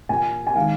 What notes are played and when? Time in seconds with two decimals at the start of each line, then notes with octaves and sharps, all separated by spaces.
0.09 A#2 A#3 G#5
0.47 G#5
0.56 D#3 G#3 F5